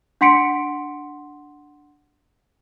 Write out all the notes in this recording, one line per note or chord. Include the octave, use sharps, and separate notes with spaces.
D4 F#5 C6 B6 C#7 D7